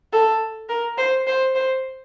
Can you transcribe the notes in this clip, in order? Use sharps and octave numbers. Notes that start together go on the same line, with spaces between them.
A4
A#4
C5
C5
C5